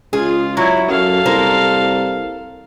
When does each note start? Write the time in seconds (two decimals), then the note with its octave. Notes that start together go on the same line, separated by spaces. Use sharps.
0.13 C#2 F4 G#4
0.57 F#3 E4 C#5
0.89 F#2 A4 F5
1.26 C2 A#3 A#4 C5